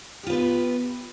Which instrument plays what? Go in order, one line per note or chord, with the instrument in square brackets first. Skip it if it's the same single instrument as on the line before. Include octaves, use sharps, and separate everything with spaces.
[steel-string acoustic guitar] G4
F4
B3
B4